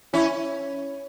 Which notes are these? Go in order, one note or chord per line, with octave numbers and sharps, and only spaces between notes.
C#4 E4